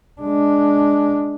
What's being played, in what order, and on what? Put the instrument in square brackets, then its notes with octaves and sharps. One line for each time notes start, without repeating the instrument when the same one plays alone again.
[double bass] G#3 D4